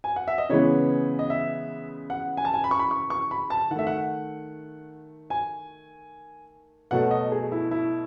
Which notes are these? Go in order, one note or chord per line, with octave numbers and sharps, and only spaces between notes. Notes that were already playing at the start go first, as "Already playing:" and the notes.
G#5
F#5
E5
D#5
C#3 E3 G#3 B3 C#5
D#5
E5
F#5
G#5
A5
G#5
B5
C#6
B5
C#6
C#6
B5
A5
D#3 A3 E5 F#5
F#5
G#5
B2 F#3 A3 F#5
D#5
G#4
E4
E4